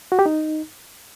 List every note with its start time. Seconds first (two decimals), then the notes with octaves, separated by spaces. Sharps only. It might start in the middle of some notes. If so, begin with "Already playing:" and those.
0.12 F#4
0.19 G4
0.26 D#4